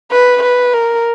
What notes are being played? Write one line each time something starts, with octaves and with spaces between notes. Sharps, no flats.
B4
B4
A#4